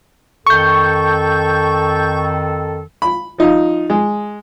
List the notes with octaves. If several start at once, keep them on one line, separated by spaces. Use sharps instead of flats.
F2 D#3 A4 C#6 G6
B5
F3 D#4 F4
G#3